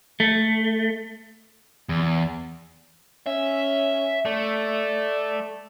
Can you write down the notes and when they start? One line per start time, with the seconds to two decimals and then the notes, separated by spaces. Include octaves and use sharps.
0.20 A3
1.89 E2
3.27 C#4 E5
4.25 A3 D5